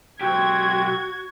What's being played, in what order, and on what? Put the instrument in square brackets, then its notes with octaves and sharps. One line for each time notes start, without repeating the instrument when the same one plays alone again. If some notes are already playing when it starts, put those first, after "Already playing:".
[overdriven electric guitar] B1 G4 [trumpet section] C4 [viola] F#4 [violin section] G#6